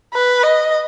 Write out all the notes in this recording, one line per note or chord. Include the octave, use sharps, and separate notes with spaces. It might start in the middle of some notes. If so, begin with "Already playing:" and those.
B4
D#5